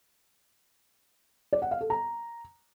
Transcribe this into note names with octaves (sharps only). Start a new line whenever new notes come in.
D5
F#5
F5
A4
A#5